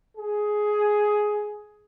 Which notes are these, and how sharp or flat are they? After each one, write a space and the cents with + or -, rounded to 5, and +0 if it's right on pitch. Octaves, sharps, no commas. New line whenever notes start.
G#4 +10